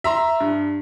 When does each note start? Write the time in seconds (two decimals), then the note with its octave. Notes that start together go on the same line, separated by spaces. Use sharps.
0.04 E5 A#5 C6
0.40 G2